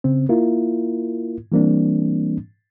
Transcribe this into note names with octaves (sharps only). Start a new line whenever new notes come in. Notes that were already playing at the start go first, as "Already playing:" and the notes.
C#3 C4
A#3 E4 F4 A#4
E3 G3 A#3 C4 D4